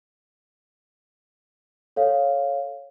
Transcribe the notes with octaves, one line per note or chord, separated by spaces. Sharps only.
A4 C#5 F5